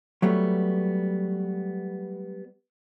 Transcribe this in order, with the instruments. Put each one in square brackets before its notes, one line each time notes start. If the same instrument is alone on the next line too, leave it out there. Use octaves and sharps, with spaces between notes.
[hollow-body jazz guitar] F#3 G3 A3 B3